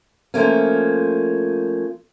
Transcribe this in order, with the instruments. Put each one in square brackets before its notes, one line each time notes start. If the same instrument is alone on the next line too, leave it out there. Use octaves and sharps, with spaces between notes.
[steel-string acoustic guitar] F3 A3 A#3 C#4